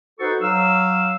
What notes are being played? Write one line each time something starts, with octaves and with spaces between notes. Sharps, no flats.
D#4 F#4 A4 B4 C5 C#6
F#3 F5 E6